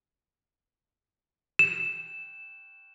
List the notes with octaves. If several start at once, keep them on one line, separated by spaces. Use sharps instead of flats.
E7